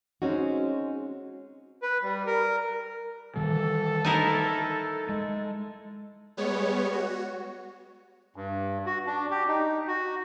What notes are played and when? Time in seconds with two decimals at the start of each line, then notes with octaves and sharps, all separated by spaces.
0.22 G#3 C4 C#4 D#4 F#4
1.83 B4
2.03 G3
2.27 A#4
3.36 D#3 E3 G3 A4
4.05 D#4 E4 A#4
5.09 G#3
6.37 G3 G#3 B3 C#5
6.93 F#4
8.36 G2
8.86 F#4
9.07 D4
9.31 G4
9.47 D#4
9.87 F#4